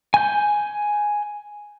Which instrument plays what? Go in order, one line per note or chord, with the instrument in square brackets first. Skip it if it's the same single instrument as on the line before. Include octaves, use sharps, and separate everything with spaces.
[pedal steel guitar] G#5 G6